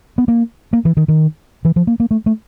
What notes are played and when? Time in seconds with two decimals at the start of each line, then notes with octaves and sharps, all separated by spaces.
0.18 B3
0.28 A#3
0.73 A#3
0.85 E3
0.97 D#3
1.08 D#3
1.65 E3
1.76 F3
1.87 A#3
2.00 A#3
2.11 A3
2.26 A3